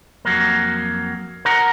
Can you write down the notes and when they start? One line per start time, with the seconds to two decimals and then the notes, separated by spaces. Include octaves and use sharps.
0.25 F2 F#3 A#3
1.45 A#4 F#5 A#5